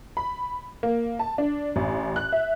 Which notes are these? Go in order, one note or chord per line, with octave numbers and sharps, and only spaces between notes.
B5
A#3
A5
D4
A1
F#6
E5